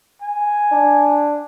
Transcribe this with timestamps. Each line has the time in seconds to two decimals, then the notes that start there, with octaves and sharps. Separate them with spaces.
0.22 G#5
0.72 D4